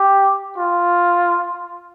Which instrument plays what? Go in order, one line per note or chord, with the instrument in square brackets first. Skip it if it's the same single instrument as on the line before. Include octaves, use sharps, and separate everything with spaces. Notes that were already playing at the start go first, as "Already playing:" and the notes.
Already playing: [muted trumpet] G4
F4